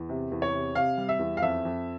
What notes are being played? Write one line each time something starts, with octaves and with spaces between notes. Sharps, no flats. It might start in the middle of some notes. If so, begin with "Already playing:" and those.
Already playing: E2
C3
E2
C#5
C3
C3 F5
G3
E5
E2
F5
F2 E5
F2